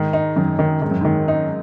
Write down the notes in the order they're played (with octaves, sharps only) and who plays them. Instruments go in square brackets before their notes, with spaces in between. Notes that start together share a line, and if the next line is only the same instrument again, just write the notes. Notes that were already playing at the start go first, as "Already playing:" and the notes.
Already playing: [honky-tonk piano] G#2 [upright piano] D#3
[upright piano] D#4
[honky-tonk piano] F#2 [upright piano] D#3
[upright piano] D#3
[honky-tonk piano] G#2 [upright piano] D#3
[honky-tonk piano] F#2
[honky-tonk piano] G#2 [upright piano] D#3
[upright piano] D#4